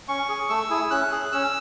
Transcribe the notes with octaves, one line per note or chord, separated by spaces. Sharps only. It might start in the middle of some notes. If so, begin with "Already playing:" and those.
C#4 C#6
G#4
A3 E6
E4 G#4
C#4 F#6
G#4
C#4 E6